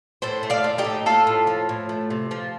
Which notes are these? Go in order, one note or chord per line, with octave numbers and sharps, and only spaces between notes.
A2 A4 C5
A3
D5 F5
A3
D#4 G4
A2
A3 F4 A4
A2
F3
A2
A3
C3
F3